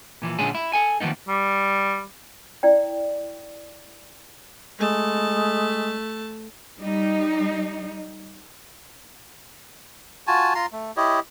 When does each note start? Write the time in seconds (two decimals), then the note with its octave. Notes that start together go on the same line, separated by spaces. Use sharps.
0.22 A#2 E3 F3
0.39 A#2 D3 G#3 C#4 D4 G#4
0.55 E4
0.73 A4 G#5
1.00 D#3 F3 A#3 B3 D#4
1.28 G3
2.63 E4 D5 G5
4.79 G#3 A3 A5
6.78 G3 D#4
10.27 F4 F#4 G#5 A5
10.55 F4 A#5 C6
10.73 A3
10.97 E4 G4 C#5 D#5